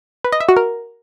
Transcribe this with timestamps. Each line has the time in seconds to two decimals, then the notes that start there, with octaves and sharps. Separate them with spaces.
0.24 B4
0.32 D#5
0.40 E5
0.48 F#4
0.57 A#4